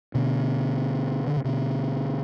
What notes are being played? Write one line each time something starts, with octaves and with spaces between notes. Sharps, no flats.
B2 D3
D3
C3
B2 D3